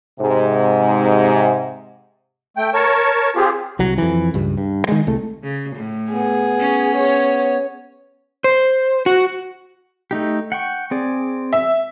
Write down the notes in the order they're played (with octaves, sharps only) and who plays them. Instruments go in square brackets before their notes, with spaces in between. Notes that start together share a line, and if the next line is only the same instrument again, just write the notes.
[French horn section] G#2 C3
[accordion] A3 G5
A#4 C#5 A5 C#6
C4 F4 G4 G#4
[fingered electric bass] C2 F#3
F2 E3
C#2 G2
G2
D#3 G#3
C2 A3
[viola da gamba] C#3
A2
[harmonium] B3 [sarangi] G#4
[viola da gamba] C#4
[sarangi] C#5
[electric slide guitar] C5
F#4
[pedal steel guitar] A3 D#4 G4
F#5 G5 C#6
C4 G#4 D5
[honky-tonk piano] E5